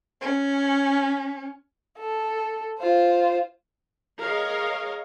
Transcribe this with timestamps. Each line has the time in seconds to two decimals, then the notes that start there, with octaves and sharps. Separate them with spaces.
0.21 C#4
1.98 A4
2.80 F4 C5
4.20 G#4 A#4 C#5 D#5 F5